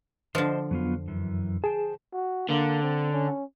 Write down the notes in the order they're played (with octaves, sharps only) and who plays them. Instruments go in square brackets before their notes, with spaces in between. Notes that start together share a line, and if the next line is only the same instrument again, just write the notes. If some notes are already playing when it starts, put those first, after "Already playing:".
[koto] D3 F3 [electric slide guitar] C5 D#5 A5
[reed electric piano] F2 [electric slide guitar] F#3 B3 F4
[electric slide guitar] F#2 E3
[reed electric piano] G#4 [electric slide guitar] C5 G5 A5
[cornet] F#4
[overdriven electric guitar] D3 [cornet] A#3
[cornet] C4
C#4